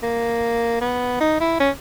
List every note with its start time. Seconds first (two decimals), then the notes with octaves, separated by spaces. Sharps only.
0.03 A#3
0.81 B3
1.21 D#4
1.40 E4
1.60 C#4